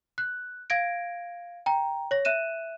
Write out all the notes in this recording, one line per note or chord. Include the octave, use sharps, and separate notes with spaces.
F#6
F5 G#6 A#6 D7
G5 A#5
C#5 A#6
E5 F#6 D#7 E7